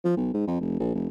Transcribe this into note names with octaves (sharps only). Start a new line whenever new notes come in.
F3
B1
G#2
F2
F1
A#1
F1